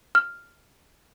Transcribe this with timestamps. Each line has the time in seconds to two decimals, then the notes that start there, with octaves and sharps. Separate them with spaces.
0.15 F6